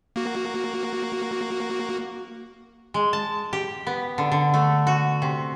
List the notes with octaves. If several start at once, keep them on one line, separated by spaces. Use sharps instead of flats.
A#3 F#4
G#3
A5
G4
B3
D3
D3
A3
F#4
C3